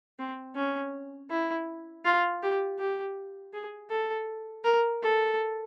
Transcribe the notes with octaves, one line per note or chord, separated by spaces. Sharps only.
C4
C#4
E4
F4
G4
G4
G#4
A4
A#4
A4